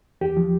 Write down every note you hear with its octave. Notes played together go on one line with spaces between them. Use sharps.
E2 G4
F3